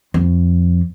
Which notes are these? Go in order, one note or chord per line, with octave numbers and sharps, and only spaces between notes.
F2